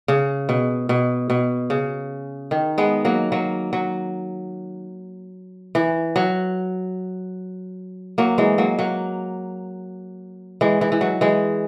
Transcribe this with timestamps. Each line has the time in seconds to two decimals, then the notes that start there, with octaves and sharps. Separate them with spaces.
0.08 C#3
0.49 B2
0.89 B2
1.30 B2
1.70 C#3
2.51 D#3
2.78 G#3 B3
3.05 F#3 A#3
3.32 F#3 A#3
3.73 F#3
5.75 E3
6.16 F#3
8.18 F#3 A#3
8.38 E3 G#3
8.58 F#3 A#3
8.79 F#3 A#3
10.61 E3 G#3
10.81 E3
10.92 E3
11.01 F#3
11.21 E3 G#3